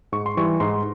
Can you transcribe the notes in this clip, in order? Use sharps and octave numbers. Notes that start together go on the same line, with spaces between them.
G#2 C#6
C6
E3 G3 C#6
G#2 C6